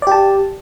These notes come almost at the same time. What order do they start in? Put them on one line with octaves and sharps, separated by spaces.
D5 G4 A5